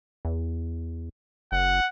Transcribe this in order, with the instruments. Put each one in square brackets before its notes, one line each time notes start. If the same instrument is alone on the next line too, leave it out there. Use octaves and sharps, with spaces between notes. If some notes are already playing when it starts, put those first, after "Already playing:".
[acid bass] E2
[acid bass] F#1 [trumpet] F#5